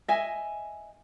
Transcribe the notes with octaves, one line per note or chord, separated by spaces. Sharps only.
D#5 E5 G#5